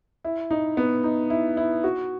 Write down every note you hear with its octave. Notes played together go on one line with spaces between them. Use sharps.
E4
D#4
B3
D#4
E4
E4
F#4